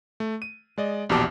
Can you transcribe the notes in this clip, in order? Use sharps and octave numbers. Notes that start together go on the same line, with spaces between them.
A3
D#7
G#3 D5 D#5
A#1 E2 B2 G4 A5 D6